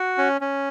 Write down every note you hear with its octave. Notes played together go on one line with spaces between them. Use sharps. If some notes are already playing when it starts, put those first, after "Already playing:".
Already playing: F#4
C#4
C#4